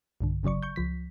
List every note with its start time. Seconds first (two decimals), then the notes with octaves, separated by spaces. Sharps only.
0.21 B1 G2 D3
0.43 G1 C#3 F#3 D5 C#6
0.63 C#6 G6
0.76 C#2 F3 B6